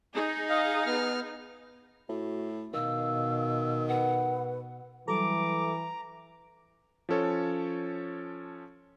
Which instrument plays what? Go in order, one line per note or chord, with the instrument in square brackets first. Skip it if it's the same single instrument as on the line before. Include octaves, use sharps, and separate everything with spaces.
[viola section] D#4 G#4
[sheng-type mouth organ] D#5 F5
B3 F6
[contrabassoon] A2 [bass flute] F#4
[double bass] B2 [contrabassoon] D#3 [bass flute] F5 [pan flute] E6
[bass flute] B4 [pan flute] F#5
[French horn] E3 [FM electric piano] F#3 G3 A4 [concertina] A#5 [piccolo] D6
[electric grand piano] F3 C#4 A4 C#5